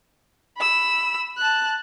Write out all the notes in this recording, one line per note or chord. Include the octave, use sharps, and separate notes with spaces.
B5 E6
A5 F#6